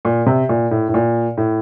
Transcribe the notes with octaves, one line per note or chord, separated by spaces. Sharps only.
A#2
C3
A#2
A2
A2
A#2
A2